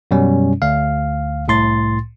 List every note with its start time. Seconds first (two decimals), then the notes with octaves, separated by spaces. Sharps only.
0.11 F#2 B2 G3 C#4
0.62 D2 F5
1.48 C2 A2 C6 A6